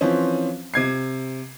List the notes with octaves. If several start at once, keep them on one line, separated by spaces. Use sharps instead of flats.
E3 F3 C4 C#4
C3 G#6 C7